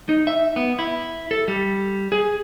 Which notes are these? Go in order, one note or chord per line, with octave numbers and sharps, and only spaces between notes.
D#4
E5
B3
E4
A4
G3
G#4